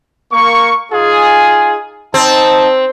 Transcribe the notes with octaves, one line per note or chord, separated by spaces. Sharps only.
A#3 C#6
D#4 F4 G#4
C4 D#4 A5